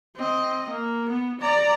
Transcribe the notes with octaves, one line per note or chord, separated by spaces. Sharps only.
C4 D#5
A#3
B3
D5 A#5